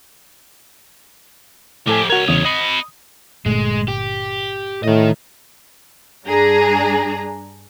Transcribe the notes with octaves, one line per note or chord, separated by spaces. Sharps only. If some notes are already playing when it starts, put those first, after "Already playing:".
A2 F3 G4 A4 G#5
C2 F#4 A#4 C#5
E2 C#3 D#6
D#5 B5 D#6
G1 A#2 G#3 A3
G4
A2 D#3 D#5
G2 D4 G#4 A#5